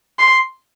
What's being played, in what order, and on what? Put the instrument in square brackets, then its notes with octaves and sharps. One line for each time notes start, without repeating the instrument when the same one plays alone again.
[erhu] C6